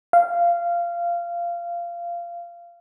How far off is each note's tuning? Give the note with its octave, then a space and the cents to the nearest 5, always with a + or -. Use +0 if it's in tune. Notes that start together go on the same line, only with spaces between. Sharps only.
F5 -15